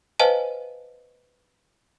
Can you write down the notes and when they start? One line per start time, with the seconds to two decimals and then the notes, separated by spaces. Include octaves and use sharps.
0.20 B4 C5 D#5 F5 G#5 A5